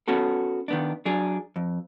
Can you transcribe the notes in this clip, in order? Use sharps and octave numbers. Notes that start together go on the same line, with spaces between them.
B3 C#4 F#4 A4
D#3 B3 D4
F#3 D4 G#4
F2